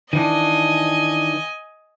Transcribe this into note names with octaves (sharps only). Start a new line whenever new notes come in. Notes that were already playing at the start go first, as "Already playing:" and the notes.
D#3 E3 D4 D#5 G#5